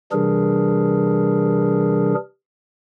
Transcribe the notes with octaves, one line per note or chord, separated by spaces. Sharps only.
C3 E3 G3 D4 G#4 A#4